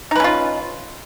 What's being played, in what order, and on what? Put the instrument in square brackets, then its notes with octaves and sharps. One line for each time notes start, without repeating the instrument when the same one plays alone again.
[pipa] D#4
B4
C#4
F4